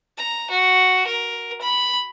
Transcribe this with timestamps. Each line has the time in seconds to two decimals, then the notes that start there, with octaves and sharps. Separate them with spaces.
0.18 A#5
0.50 F#4
1.06 A#4
1.61 B5